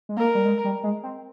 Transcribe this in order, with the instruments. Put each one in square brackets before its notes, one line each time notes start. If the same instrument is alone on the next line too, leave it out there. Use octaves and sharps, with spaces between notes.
[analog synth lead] G#3
[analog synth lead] A#3 [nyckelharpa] A#4
[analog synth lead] G3
G#3
G3
G#3
C4